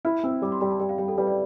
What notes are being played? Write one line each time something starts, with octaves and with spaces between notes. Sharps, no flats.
E4 F6
C4 E6
G3 D6
C6
G3 B5
A5
G3 G5
F5
G3 G5
A4
G3 B4
D5